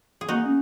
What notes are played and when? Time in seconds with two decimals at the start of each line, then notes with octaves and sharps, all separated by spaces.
0.21 G#4
0.28 A#3 D#4 F#4
0.46 C#4